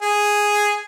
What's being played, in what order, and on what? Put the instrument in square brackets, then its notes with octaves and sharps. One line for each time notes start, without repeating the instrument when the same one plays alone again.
[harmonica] G#4